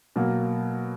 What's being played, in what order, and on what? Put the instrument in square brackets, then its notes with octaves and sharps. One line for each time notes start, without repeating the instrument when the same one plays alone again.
[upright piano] B2 F#3 A#3